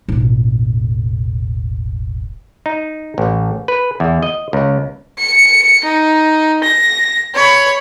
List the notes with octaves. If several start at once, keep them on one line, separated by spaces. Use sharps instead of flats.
E1 A1
D#4
A1
B4
E2
D#5
C#2
C#7
D#4
A#6
C#5 B5